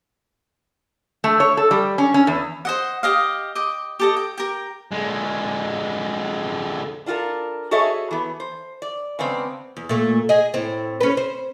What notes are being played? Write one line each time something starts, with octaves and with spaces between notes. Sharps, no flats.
A3
C#5
A4
G3
C#4
C#4
E2
C5 D#5 F#5
G4 D#5 F5
D#5 G5 D6
G4 A4 D#5
G5
G4 A#4
D3 G#3
D4 F4 F#4 A4 A#4
F#4 G#4 A4 C#5 D#5 E5
E3 B3
C5
D5
C#3 G#3 B3 C4 D4
E2
A#2 A3
G#4 D#5
A2 C4
C#4 B4
C5